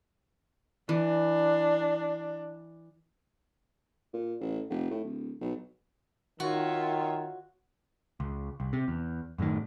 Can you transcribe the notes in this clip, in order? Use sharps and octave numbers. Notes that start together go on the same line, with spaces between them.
E3 D4
A#2
A1
F1
A2
D1
B1
D#3 F4 F#4 C#5 E5
C#2
C2
C3
E2
F#2 A2 C3 D#3